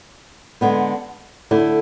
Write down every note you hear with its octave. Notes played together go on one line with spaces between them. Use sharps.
D3 G#3 B3
D3 A3 E4